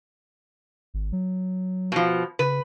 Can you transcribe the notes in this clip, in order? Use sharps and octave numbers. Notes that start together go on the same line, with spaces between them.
G#1
F#3
B2 F3
C#3 B4